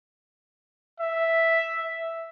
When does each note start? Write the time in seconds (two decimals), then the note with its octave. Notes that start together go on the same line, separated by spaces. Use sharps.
1.00 E5